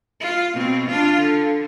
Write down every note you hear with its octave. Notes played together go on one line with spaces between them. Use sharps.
F4
B2 C4
D4 F4
D3